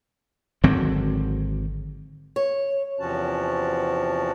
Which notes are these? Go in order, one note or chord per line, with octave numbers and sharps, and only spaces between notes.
G#1 D3 F#3 C4
C#5
E2 C3 F3 C#4 F#4 A5